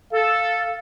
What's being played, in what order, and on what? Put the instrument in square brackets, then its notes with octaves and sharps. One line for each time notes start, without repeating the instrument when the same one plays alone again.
[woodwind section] A4 [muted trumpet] F5